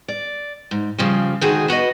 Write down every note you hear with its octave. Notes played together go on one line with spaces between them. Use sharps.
D5
G#2
C#3 F3 G3
G#2 D3 D#3 F#4 G#4
B3 F#4 B4 D#5